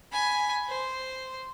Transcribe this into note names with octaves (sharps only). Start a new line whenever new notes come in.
G#5 B5
C5